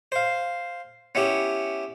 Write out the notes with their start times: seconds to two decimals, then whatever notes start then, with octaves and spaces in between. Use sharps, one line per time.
0.12 C5 F5
1.15 B3 C#4 E4 G4